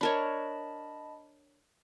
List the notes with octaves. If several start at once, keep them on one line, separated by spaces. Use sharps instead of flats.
D4 A#4 C#5 D#5 A5 B5